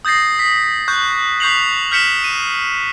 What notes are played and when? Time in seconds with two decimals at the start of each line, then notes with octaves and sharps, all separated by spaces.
0.05 D#6 G6 A6 A#6 C7
0.39 D#6 B6
0.88 C#6 F#6 G6
1.40 C#6 G6 B6 C7 F7 F#7
1.91 F6 G6 B6 C#7 E7 G7
2.24 D#7